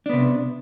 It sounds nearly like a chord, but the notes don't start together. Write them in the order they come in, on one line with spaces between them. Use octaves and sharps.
D4 B3 C3